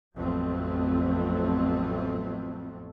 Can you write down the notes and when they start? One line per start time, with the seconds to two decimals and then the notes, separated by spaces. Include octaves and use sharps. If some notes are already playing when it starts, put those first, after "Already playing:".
0.16 A1 F2 F#3 A3 B3 C4